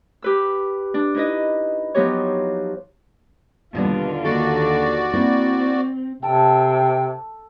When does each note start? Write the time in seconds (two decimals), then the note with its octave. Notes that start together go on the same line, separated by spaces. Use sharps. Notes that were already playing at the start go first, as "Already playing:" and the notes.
0.22 G4 B4 E6
0.94 D4
1.15 D#4 E4 B4 D#5
1.95 F3 F#3 B3 D#4 G4 C#5
3.75 D#2 B2 D3 G3 B3 F4
4.25 A#3 D4 F#4 A4 D5
5.13 A#3 C4 E4
6.22 C3 A4 G5 A5